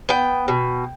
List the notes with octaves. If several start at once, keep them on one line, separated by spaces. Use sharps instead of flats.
B3 G5
B2